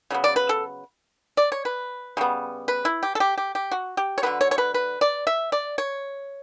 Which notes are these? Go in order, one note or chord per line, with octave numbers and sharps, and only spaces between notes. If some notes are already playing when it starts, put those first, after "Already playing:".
C#3 F#3 B3
D5
B4
A4
D5
C#5
B4
C#3 G3 B3
B4
E4
G4
A4
G4
G4
G4
F#4
G4
C#5
D3 F#3 B3 B4
C#5
C#5
B4
B4
D5
E5
D5
C#5